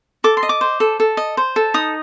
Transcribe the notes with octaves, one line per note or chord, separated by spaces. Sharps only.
A4 D6
C6
D#5
D6
C5
A4
A4
D#5
C5
A4
D#4 D#6